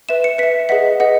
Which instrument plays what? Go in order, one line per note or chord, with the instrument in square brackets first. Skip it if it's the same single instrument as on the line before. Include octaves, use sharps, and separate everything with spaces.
[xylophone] B4 E5 E7
C#7
B4 E5 B6
G#4 B4 D#5 F#5 B6
G#4 B4 D#5 F#5